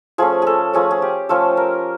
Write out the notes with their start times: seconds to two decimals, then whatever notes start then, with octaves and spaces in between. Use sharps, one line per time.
0.18 F3 A3 C#4 G#4
0.42 G#4 A4
0.74 F3 A3 C#4 G#4
0.91 G#4
1.02 G4
1.29 F3 A3 C#4 A4
1.57 A#4